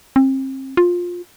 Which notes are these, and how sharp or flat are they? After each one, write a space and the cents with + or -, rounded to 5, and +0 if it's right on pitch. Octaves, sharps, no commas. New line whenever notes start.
C4 +35
F4 +15